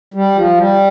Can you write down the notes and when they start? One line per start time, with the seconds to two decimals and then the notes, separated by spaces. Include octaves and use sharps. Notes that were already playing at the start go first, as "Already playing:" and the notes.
0.14 G3
0.36 F3
0.58 G3